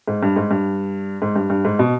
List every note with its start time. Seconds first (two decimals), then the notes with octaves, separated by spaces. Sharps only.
0.08 G#2
0.23 G2
0.36 G#2
0.51 G2
1.22 G#2
1.36 G2
1.50 G2
1.65 G#2
1.79 B2